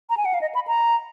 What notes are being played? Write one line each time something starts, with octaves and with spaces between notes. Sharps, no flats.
A#5
G#5
F#5
F5
D#5
B5
A#5